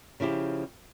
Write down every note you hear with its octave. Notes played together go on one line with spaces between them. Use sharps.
C#3 F3 E4 G4